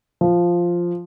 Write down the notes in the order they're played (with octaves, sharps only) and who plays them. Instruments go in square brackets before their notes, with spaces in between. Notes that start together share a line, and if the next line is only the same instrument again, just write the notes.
[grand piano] F3